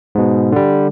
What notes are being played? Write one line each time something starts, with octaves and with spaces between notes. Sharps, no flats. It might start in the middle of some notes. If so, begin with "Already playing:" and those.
G#2 B2
D3 G3